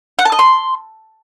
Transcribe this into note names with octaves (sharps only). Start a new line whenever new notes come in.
F#5
A5
D#5
C6